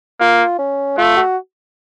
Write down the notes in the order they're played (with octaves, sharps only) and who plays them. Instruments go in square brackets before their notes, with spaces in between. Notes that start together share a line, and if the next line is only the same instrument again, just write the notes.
[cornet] A#3 [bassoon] F4
[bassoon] C#4
[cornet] A3 [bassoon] F4
[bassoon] F#4